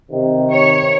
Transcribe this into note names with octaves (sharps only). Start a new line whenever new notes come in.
C3 D#3
C#5